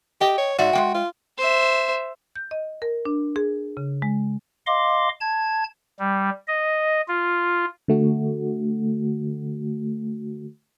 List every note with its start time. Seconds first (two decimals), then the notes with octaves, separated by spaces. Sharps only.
0.21 G4 D#5 G5
0.38 C#5
0.58 G#2 F#4 D5 E5
0.73 G#3 A#3 G5
0.94 F4
1.38 C5 E5
2.36 G6
2.51 D#5
2.82 A#4
3.05 D4
3.36 G#4
3.77 C#3
4.02 G#3
4.67 D#5 F5 C6 D6
5.21 A5 G#6
5.99 G3
6.47 D#5
7.08 F4
7.88 D3 A3 F#4